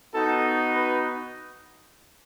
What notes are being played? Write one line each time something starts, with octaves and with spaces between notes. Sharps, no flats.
B3 D#4 F#4 A4
B4